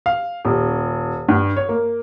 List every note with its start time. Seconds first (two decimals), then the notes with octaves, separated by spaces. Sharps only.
0.06 F5
0.45 D#1
1.28 G2
1.57 C#5
1.69 A#3